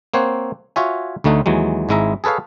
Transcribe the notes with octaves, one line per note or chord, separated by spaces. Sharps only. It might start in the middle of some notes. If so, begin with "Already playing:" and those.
A#3 C4 C5 C#5 F#5
F4 F#4 C#5 E5 G#5
D2 D3 A3 D#4 F#5
D#2 E3 F#3 G#3
G#1 G#2 G#3 E4 E5 A#5
G#4 A4 B4 C#5 F5